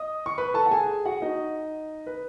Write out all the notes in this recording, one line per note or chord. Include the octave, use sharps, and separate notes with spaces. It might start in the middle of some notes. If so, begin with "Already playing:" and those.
Already playing: D#5 D#6
C#6
B4 B5
A4 A5
F#5
G#4 G#5
F#4 F#5
D#4 D#5
B4